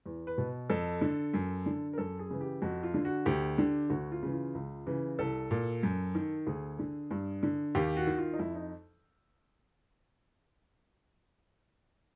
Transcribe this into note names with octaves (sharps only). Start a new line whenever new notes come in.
E2
B4
B2
F2 A4
D3
F#2
D3
A#4
F#2 A4
G#4
C#3 E3
G4
F2 F#4
F4
D3
F#4
D2 G4
D3
D2 F#4
F4
C#3 E3
F4
C#2
C#3 E3
C2 A4
A#2
F#2
D#3
D2 G#4
D3
G2
D3
D#2 G4
F#4
D#3
F4
D#4
F2 E4
D#4